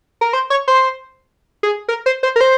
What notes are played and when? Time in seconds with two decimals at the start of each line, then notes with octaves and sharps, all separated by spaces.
0.21 A#4
0.33 C5
0.50 C#5
0.68 C5
1.63 G#4
1.88 A#4
2.06 C5
2.23 C5
2.36 A#4
2.41 C5